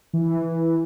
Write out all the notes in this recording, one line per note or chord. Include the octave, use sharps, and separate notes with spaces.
E3